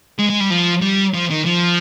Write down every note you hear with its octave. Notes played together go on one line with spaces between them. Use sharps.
G#3
G#3
G3
F3
G3
F3
D#3
F3